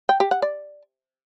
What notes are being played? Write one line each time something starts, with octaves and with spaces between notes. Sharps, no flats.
G5
G4
F#5
D5